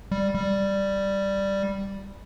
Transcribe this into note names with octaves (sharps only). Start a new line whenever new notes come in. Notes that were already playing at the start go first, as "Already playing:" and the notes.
G3
G3